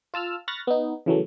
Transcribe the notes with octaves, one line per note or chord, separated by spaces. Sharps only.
F4 A5 E6 F6
B5 C#6 F6 F#6 A6 A#6
B3 D#4
C#3 E3 F#3 A3